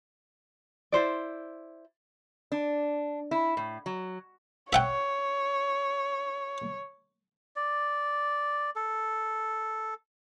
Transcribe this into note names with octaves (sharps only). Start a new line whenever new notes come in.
E4 C5 D5
D4
E4
A2
F#3
C#5 E5 F#5 G5
D5
A4